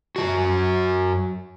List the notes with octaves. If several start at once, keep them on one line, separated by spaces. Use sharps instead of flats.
F#2 D#3 F#4